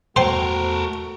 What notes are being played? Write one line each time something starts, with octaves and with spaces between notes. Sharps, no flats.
E2 A3 F#4 A4 A#4 C5 G5